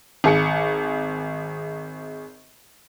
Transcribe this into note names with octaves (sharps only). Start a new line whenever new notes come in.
G#1 G#4 C#7